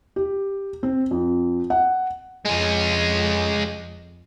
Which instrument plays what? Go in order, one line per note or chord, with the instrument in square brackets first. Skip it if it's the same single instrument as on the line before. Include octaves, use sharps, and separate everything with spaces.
[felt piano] G4
C4
F2
F#5
[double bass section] F2 [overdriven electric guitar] G#3 C#4